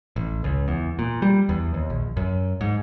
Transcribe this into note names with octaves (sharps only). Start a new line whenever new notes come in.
A1
C#2
E2
A#2
G3
E2
D#2
A#1
F#2
G#2